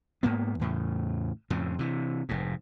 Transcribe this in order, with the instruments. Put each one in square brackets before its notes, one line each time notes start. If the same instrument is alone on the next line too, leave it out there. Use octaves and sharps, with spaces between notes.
[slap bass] G#2 A#3 B3
E2 A2 C#3
F2 A2 C#3
C3 E3
F1 G#2